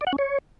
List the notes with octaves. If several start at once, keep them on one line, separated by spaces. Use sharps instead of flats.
D5
F#5
C#4
C#5